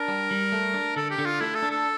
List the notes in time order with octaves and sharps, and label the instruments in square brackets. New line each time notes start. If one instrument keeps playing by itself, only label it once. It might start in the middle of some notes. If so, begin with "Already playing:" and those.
Already playing: [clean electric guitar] D4 [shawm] A#4
[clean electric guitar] G3
G3
A3
D4
[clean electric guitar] D3 [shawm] A4
[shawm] G4
[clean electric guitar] D3
[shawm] F4
[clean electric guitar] A3 [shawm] E4
[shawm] A4
[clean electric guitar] D4
[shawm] A4